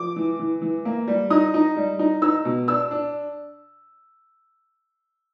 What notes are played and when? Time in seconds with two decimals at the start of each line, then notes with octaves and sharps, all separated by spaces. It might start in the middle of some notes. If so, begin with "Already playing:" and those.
Already playing: F3 D6
0.16 E3
0.39 E3
0.62 E3
0.85 A#3
1.08 G3
1.30 D#4 D#6
1.54 D#4
1.77 G3
1.99 D#4
2.22 D#4 E6
2.45 B2
2.68 D4 E6
2.91 D4